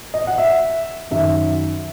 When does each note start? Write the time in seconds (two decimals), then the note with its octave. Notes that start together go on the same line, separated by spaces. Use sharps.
0.14 D#5
0.27 F#5
0.38 E5
1.11 F#2 D#3 F#3 E5